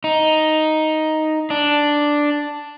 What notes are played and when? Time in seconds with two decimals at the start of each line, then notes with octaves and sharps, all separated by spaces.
0.04 D#4
1.50 D4